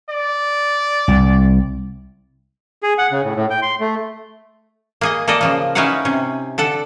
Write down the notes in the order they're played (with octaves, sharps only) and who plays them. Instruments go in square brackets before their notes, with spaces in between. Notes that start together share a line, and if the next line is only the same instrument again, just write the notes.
[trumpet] D5
[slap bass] C2
[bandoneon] G#4
F#5
C#3
A2
A2
G5
C6
A3
[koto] A#3 G#4 D#5
A#3 A4 D5 D#5
C#3 F3 A#3
C#4 D#4 E4 B4 F5 F#5
C3 C#4
D3 A4 F#5